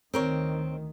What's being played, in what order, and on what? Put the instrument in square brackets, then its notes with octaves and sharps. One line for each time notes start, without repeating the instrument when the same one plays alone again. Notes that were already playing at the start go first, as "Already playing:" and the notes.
[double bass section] D2 D#3 [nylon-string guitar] C4 A#4 C#5